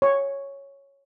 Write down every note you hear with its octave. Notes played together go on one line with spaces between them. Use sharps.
C#5 C#6